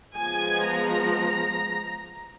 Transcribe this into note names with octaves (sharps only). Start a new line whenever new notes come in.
F3 G#3 B3 G#5
A#5